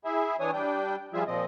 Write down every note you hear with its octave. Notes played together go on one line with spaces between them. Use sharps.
E4 G#4 E5
E3 D4 C#5 G#5 D#6
G3 D4 G5
F3 G3 F4 G#4 E5
A#2 F3 C4 D#5